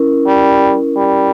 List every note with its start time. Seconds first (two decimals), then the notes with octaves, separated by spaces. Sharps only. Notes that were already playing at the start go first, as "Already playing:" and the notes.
Already playing: C#4 E4 A#4
0.27 G3
0.97 G3